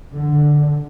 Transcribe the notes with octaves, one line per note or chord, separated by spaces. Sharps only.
D3